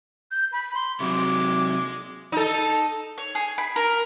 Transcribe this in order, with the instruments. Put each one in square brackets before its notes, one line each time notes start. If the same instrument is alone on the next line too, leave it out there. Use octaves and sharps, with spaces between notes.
[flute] G6
B5
C6
[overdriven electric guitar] C3 F#3 [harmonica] G#3 D6
[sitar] D#4 A4
[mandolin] C#5
G#4
B5
A#4